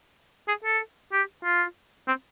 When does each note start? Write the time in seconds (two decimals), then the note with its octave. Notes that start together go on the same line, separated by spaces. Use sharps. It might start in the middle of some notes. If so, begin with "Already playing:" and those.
0.48 G#4
0.64 A4
1.12 G4
1.44 F4
2.08 C4